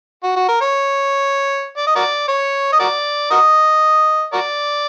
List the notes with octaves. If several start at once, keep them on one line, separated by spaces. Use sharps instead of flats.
F#4
F#4
A#4
C#5
D5
D#5
F#4 A#4 D5
C#5
D#5
F#4 A#4 D5
F#4 A#4 D#5
F#4 A#4 D5